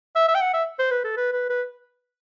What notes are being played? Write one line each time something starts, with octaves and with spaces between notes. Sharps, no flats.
E5
E5
G5
F#5
E5
C5
B4
A4
B4
B4
B4